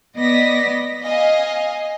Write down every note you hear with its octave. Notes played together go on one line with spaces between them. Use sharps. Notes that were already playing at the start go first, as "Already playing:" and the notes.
B3 D5 D#5 A#6 B6
D#5 F5 G#5